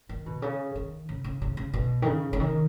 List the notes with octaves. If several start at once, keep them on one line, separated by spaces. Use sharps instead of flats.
D#3
B2
C#3
D#3
C#3
C#3
C#3
C#3
B2
D#3
C#3
C#3
D#3